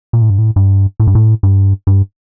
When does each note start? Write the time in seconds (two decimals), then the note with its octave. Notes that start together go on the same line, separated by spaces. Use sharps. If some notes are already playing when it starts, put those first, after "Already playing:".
0.13 A#2
0.21 A2
0.30 G2
0.38 A2
0.56 G2
1.00 A2
1.07 G2
1.15 A2
1.43 G2
1.87 G2